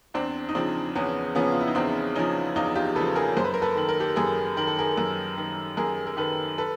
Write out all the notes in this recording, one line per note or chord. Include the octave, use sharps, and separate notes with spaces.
E2 C4 D4
D#4
C#3 F3 C4 D4
E2 B3 C#4
C#3 F3 B3 C#4
F4
E4
D#4
E2 C4 D4
C#3 F3 C#4 D#4
E2 D#4 F4
F4 G4
C#3 F3 A4 B4
G#4 A#4
F#2 C5
B4
A#4
A4 B4
D#3 A4
A#4
G4 A4
F#2 G#4 A#4
D#3 A#4
A4
G#4 A#4
F#2
D#3
F#2 G#4 A#4
A#4
D#3 A4 B4
A4 B4